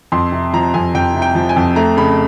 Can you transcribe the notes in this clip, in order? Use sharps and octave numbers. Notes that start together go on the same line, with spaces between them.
F2 C6
C3
F3 A#5
F2 G#5
F2 G5
C3
G5
F3
G#5
F2
A3 A#5
C#3 B5